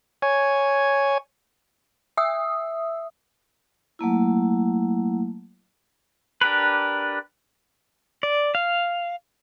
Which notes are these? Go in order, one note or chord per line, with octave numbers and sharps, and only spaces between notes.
C#5 G#5
E5 D#6 E6
F#3 A3 A#3 E4
D4 G4 A#4 B4
D5
F5